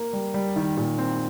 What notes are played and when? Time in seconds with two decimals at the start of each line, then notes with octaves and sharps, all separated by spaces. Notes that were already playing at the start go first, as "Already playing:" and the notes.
Already playing: A#3
0.13 G3
0.34 G3
0.56 D#3
0.77 A#2
0.98 C4